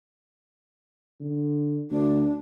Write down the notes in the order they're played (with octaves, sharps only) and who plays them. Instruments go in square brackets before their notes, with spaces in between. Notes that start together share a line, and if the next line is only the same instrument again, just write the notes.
[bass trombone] D3
[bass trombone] D2 [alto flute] D4